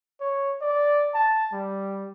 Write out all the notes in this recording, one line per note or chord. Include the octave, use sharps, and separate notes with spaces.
C#5
D5
A5
G3